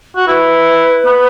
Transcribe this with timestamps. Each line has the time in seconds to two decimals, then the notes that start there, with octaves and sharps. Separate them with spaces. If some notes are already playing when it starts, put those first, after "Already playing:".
0.16 F#4
0.27 E4 B4
1.06 B3